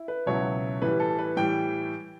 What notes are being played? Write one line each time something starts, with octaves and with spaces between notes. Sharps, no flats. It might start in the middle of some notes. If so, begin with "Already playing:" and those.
Already playing: E4
B4
C#2 B2 F#3 C#4 E4 C#5
A2 E3 G3 B4
A4
B4
A2 E3 G3 G5